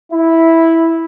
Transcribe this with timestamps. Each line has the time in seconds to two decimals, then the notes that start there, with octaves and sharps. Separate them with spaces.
0.12 E4